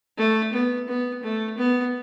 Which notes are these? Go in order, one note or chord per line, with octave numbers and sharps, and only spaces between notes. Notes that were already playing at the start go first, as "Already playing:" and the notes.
A3
B3
B3
A3
B3